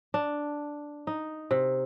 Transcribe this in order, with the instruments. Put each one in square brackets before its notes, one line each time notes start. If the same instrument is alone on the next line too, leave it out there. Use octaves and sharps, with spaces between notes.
[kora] D4
D#4
C3